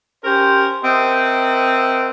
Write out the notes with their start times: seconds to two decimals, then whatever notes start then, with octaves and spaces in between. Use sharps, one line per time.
0.24 C#4 G4 A#4 C5
0.84 C4 A#4 D#5 E5 F#5